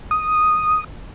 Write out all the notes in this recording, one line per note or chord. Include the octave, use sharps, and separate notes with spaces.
D#6